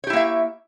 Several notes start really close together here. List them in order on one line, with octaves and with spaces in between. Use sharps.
C#5 G4 E4 A#3 E5